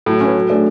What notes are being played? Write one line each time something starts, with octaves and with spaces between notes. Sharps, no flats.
A2 F#3
C#4 E4 B4
F#3
A3 D4 G#4